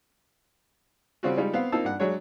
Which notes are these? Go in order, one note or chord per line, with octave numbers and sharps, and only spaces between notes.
C#3 G3 C4 C#4 F4 F#4
G3 G#3 D#4 F4
B3 C4 F5
A#3 C4 D#4 F4 A5 E6
G2 F#5
F#3 G#3 D4 C#5